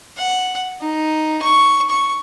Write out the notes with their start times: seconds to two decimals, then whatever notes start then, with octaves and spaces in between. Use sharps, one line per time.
0.17 F#5
0.81 D#4
1.42 C#6
1.90 C#6